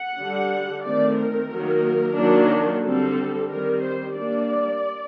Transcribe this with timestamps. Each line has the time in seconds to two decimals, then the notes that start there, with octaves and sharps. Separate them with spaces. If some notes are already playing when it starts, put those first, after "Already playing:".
Already playing: F#5
0.18 D3 G3 D4
0.85 D#3 A3 C4 D5
1.18 A#4
1.52 D#3 F#3 A#3
2.18 D#3 F#3 A#3 D4
2.84 D3 G3 C4 A4
3.51 D#3 G3 C4 A#4
3.85 C5
4.18 G3 A#3 D4 D5